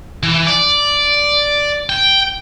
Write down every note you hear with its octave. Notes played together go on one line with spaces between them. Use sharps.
E3
D5
G5